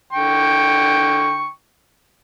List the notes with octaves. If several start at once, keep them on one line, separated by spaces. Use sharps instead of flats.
D3 G5 C#6